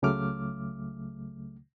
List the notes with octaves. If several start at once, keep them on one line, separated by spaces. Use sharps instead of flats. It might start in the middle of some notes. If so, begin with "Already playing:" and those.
C#2 C#3 F#3 A3 D6 F6